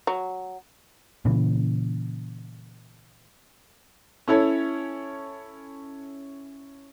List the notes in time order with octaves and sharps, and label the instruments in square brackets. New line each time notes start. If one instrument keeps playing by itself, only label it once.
[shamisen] F#3
[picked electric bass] A#2 C#3 E3
[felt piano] C#4 E4 A4 C#5